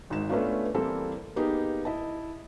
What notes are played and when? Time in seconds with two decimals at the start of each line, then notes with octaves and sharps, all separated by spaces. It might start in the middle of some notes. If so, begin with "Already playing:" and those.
0.10 G#1 G#2 E7
0.29 A3 B3 C#4 D4 F4
0.74 E3 G3 A#3 C4 E4 A4
1.36 A#3 B3 D#4 G4 G#4
1.85 E4 D#5 A5